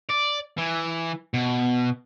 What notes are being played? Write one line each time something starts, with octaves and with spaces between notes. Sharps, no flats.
D5
E3
B2